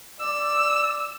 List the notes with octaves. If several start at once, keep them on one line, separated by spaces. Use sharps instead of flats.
D5 E6